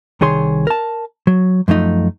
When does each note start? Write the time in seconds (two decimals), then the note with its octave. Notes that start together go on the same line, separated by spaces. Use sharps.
0.21 C2 D#3 G#4 C#5 C6
0.67 A#4 A5
1.27 F#3
1.68 F#2 F3 A3 D#4